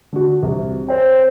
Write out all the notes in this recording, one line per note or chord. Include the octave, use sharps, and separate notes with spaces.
D3 F#4
C2
C4 C5 C#5 G5